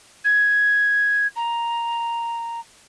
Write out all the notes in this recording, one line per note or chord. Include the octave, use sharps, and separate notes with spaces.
G#6
A#5